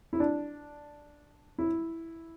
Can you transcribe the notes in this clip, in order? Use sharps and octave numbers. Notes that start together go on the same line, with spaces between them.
E4
D4
E4